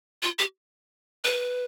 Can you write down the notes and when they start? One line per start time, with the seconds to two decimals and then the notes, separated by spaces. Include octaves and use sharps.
0.23 F4
0.39 G4
1.24 B4